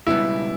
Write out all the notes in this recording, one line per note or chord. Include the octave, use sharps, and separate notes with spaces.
C#2 B2 G3 B3 E4